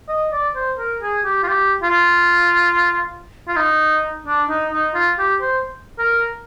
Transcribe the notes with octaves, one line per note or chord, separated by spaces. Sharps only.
D#5
D5
C5
A#4
G#4
G4
F4
G4
F4
F4
D#4
D4
D#4
D#4
F4
G4
C5
A#4